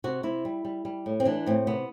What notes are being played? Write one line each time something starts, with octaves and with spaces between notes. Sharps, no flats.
C3 F#4
C3 E4
G3
G3
G3
A2
C4
E3 D4
A2 C4
C3 B3